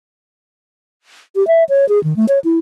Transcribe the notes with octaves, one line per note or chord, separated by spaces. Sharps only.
G4
E5
C#5
G#4
D#3
A3
C#5
E4